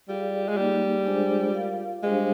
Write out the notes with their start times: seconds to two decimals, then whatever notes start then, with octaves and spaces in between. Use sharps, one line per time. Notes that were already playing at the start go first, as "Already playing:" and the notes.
0.08 G3 F4 G#4 D5 F5
0.48 G#3
0.57 G3 A#3 D#4 G#4
1.06 G#3 D4 F4 G#4 C5
1.54 F4 A#4 F5
2.03 G3 G#3 D4 G4 C5 F5